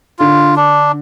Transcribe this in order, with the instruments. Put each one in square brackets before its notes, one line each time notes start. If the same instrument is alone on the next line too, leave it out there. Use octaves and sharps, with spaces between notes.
[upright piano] D3 [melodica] F4
[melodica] D4